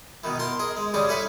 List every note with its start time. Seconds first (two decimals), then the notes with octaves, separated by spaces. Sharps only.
0.24 B2 D#3 E3
0.39 A#4 A5 C6
0.59 G#4 A#4 D#5
0.77 G#3
0.94 C#3 G3 D4 G#4
1.08 C#4 E4 A4 B4 E5 G#5